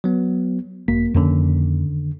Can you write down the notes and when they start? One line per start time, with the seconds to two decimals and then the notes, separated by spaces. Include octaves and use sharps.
0.04 F#3 B3
0.88 G#1 F#2 A#3 B6
1.14 F2 D3 D#3 A#3 C#4